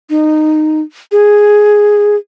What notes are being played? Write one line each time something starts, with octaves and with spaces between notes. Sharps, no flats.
D#4
G#4